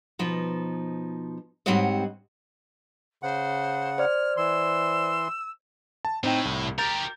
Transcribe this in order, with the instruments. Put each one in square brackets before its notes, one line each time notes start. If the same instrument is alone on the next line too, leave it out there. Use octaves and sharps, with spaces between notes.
[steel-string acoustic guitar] B2 F3 D#4
G#2 G3 C4 F#4 C#5 D#5
[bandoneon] C#3 F#5 [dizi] C5
[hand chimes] C5 D5 [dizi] F6
[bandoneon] E3 C6 [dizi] E6
[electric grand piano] A5
[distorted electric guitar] A2 [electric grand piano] C4 D#4 G5
[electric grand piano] C2
[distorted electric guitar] G4 A#4 [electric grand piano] A#5 G6 A6